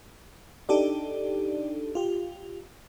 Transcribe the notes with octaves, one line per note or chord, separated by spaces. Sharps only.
D4 D#4 G4 A4 D5
F4 G4